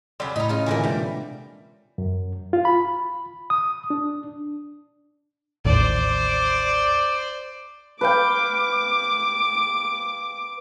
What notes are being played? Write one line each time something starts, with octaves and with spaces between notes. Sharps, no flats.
C#3 F#3 G3 B5 C6
A2 D#4 A#5 B5
C#3 F4
A#2 D3 E3 A#4 G#5
C3 G3 G#3 D4 G5
F#2
F4
B5
D#6
D4
A1 D#2 C5 D5
B4 F5 G5 D6